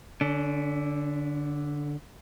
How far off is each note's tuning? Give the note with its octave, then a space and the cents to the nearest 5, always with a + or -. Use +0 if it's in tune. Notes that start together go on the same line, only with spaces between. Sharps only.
D3 +0 C#4 +40